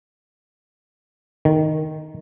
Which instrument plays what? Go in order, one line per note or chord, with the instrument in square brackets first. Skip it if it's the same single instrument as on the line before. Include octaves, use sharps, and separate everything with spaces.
[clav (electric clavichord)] D#3